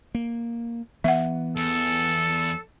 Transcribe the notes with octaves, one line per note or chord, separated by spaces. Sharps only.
A#3
E3 B3 E5 F#5
E2 A4